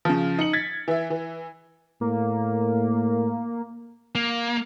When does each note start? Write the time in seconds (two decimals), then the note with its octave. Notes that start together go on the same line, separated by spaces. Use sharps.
0.05 C#3 F3
0.38 D#4 C#7 F#7
0.53 G#6 A6 B6
0.88 E3 E5
1.10 E3
2.01 A2 A#3
4.15 A#3